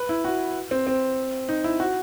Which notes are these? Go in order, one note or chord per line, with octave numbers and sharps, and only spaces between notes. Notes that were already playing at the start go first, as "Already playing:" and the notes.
Already playing: B4
E4
F#4
C4
C4
D#4
E4
F#4